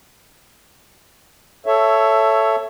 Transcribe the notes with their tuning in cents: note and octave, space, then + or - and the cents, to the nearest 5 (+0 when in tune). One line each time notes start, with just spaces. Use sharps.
A4 +0 C#5 +5 E5 +15